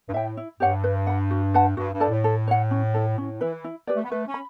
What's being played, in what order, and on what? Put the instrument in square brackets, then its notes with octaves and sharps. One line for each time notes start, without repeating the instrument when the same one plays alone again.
[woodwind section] G2
[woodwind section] A2 [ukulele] E5 G5
[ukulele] E4
[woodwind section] G2 [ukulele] G4 C#5 F#5
[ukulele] B4
F#5 B5
F#4
B4 F#5 A5
[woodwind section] G2 [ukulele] F#4
[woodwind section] G2
[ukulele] A4 D5 A5
[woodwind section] A2
[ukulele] A4
C#5 F#5
C#4
E4 A4
[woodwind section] A2 [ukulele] C#4
[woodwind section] E3 [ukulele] E4 B4
[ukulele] E4
G4 B4 D5
[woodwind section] A3
B3
[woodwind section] A3 [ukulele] B4
[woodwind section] C#4
[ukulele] B5